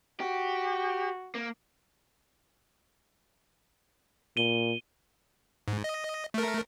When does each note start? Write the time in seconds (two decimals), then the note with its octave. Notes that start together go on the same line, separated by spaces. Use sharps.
0.20 F#4 G4
1.35 A#3
4.37 A#2 D#7 G7
5.68 G#2
5.84 D#5
6.34 A3 A#4